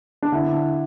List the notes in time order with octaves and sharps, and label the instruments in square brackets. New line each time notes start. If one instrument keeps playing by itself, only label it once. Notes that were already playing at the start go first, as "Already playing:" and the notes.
[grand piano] D4
D3 E4